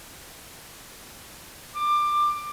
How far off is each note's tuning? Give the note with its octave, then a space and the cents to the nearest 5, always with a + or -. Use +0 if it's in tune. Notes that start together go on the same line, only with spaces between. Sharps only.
D6 +20